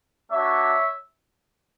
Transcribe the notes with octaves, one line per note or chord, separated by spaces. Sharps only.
A#3 D4 F#4 C#5 E5